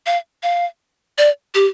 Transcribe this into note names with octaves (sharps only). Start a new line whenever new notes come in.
F5
F5
D5
G4